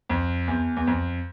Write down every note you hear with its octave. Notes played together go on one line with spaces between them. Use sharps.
F2
E2
E2
F2